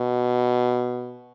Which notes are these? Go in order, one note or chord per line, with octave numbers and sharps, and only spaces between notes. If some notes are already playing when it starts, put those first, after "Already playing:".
Already playing: B2